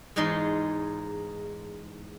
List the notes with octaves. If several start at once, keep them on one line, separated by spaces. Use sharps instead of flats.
E2 G#2 G#3 D#4 F4 C6